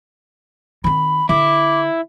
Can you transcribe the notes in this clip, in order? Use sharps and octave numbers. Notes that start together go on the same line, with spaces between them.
D#3 C4 B5
D3 E4 D6